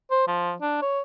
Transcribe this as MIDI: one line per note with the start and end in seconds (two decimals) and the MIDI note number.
0.11 0.26 72
0.28 0.53 53
0.61 0.78 62
0.82 1.01 73